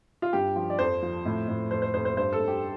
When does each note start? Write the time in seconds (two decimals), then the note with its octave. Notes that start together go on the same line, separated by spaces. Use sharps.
0.22 F4
0.33 G2 G4
0.56 F3
0.70 D5
0.79 F2 C5
1.03 F3
1.25 A2
1.48 A2
1.71 F2 C5
1.82 C5
1.94 F2 C5
2.05 C5
2.17 G2 C5
2.33 A4
2.40 G2
2.48 G4